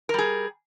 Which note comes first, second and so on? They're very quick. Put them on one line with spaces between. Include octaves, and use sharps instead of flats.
A#4 G3 G#4